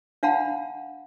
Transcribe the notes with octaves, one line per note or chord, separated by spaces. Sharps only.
D4 F5 F#5 A5 B5